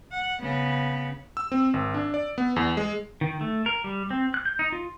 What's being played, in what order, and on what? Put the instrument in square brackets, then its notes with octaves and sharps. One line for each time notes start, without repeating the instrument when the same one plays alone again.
[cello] F#5
C#3 B3
[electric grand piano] E6
C4
G#1
D4
D5
B3
E2
G#3
[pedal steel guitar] D#3
A3
A#4
G3
C4
F#6
G6
D#4
F4